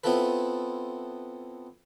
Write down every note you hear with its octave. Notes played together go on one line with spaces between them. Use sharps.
B3 C4 E4 F4 A4 B4